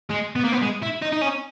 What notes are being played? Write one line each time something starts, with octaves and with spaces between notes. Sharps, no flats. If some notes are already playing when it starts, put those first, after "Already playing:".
G#3
B3
A#3
B3
G#3
E4
D#4
D#4
C#4